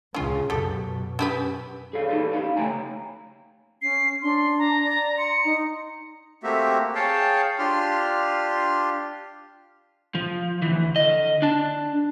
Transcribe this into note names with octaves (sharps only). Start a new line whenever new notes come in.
C#2 C#3 C#4 F4
F#2 B2 G4 A4
C#4 G4 B4
G#4 A4 B4 C#5 F5
D#4 G4 A4 B4 D5
D#4 G4 F5 B5
C#3 A3 C#5 G5 G#5 A#5
C#4 C7
D4 C6
A#5
D5
C6 C#7
D#4
A3 A#3 C4 F#4 G4 E5
G#4 C#5 F5 G5 A5
D4 F4 G4 C6 F6
F3
D2 E3
D3 D#5
D4 A5